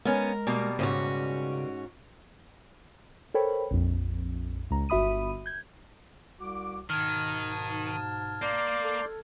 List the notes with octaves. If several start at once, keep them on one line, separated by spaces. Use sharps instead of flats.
G#3 B3 C#4 A#4
B2 G3 A#3
G#2 C#3 C#4 F#4
A4 A#4 C5 C#5 G5 B5
A#1 F2
C#2 A#5
G1 F#4 E5 B5 D#6 D#7
G6 G#6
C2 F#4 D6
G#2 B2 D#3 A5 D#6 F6 G#6
A#3 D5 C6 G6
A4